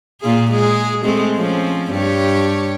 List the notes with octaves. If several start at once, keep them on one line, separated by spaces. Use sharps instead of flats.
A#2 F4 G#4
G#3 G#4
G#3 A3 C4
F3 C4 C#4
G2 G4 C#5